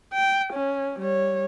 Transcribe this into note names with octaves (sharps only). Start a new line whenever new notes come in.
G5
C#4
G3 C#5